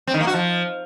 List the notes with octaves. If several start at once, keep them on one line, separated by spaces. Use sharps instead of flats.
C4
D#3
A#3
F#4
F3